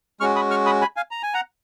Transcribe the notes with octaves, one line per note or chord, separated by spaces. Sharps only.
G#3 C#4 F#4 C#6 F6
B5 D#6
C#6 F6
B5 D#6
G#5 B5
F5 G#5
A#5
G#5
F#5 A#5